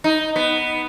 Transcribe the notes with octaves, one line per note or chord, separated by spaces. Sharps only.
D#4
B3